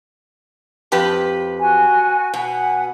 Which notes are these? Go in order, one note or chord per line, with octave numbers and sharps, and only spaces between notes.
F2 G4 B4
F#4 G#5
B2 F#5 G#5